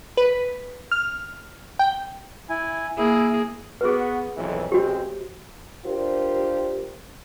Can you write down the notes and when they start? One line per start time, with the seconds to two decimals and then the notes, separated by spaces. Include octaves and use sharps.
0.17 B4
0.92 F6
1.79 G5
2.49 E4 G#5
2.98 A#3 E4 G#4
3.81 B3 F#4 G#4 B4
4.37 B1 F2 E3
4.72 A1 G#3 C4 F#4 G4
5.85 D4 F4 G4 A#4 C5